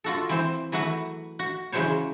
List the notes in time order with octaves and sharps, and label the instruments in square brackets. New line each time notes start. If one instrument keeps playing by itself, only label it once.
[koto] F4 F#4 A4
E3 C4 C5
E3 F#3 A3 F#4 B4
F#4
C#3 E3 F#3 G#3 C5 C#5